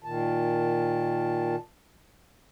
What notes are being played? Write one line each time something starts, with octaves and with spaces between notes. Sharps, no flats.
A#2 D#3 A5